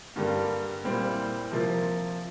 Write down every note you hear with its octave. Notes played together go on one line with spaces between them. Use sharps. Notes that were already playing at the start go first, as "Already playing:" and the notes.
G2 D3 G3 A#3
A#2 G3 C4 E4
C3 F3 A#3